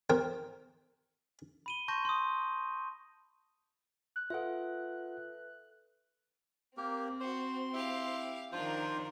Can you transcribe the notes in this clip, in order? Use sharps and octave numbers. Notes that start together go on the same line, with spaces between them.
A#4 C5 G5
B5 D#7 G7
A5 C6 C#6 G6 A#6
C6 D#6
F#6
F4 A4 B4 E5 F#5
A#3 C4 G4 A#4
F#4 C5 C6
E4 G4 F5
D#3 F3 D4 F4 A#4 C5